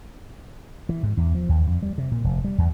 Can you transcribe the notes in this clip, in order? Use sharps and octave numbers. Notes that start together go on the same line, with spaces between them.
E3
G#2
E2
F3
D#2
F2
G3
C3
A#2
F1
G3
E2